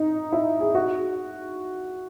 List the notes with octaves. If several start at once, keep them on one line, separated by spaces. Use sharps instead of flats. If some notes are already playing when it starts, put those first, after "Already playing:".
Already playing: D#4
E4
G#4
F#4